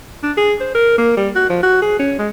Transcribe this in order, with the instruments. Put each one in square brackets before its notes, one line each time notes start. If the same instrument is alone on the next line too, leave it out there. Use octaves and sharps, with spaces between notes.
[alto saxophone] D4
G#4
C5
A#4
A#3
G3
F#4
F3
F#4
G#4
C#4
G#3